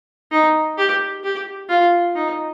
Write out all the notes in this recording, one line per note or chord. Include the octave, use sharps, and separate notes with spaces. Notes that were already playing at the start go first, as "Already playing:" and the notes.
D#4
G4
G4
F4
D#4